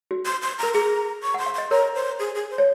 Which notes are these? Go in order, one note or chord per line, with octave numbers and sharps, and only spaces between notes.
F#4
C6
C6
A#4 A#5
G#4 A#5
C#6
F#5 C6
F5
D#5 C6
A#4 C#5 A#5
C5
G#4
G#4
C5
C#5